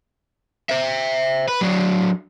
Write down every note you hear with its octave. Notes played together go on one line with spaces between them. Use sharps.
C5 E5
B4
F#3 D4